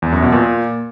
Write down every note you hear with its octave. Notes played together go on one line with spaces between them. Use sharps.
E2
F#2
B2
A#2